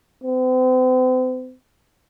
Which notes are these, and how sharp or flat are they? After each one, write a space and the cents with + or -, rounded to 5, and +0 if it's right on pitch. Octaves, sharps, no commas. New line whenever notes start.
C4 -40